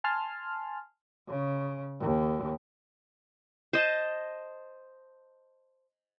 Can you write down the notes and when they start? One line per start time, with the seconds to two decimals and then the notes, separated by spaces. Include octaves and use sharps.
0.04 G#5 A5 C6 F6
1.28 C#3
2.00 D#2
3.73 C5 D#5 A5